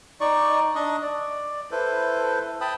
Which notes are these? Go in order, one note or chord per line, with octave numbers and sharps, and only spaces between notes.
D#4 D5 C#6
D4 D#5 C#6 D#6
D5
E4 A4 B4 C5
G5 A5 B5 D#6